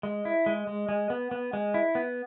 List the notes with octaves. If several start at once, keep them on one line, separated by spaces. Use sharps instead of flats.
G#3
E4
G#3
G#3
G#3
B3
B3
G#3
E4
B3